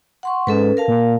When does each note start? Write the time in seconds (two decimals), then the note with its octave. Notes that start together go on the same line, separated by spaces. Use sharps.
0.23 F#5 C6 C#6
0.47 G#2 C#4 A4 B4
0.77 A#4 F5 A5
0.88 A#2